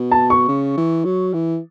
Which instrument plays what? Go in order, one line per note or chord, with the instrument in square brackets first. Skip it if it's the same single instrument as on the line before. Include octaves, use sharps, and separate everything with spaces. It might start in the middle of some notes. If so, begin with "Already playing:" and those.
Already playing: [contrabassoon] B2
[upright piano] A5
C#6
[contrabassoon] C#3
E3
F#3
E3